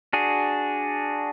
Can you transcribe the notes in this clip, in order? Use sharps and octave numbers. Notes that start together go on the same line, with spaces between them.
D4 F#4 G#4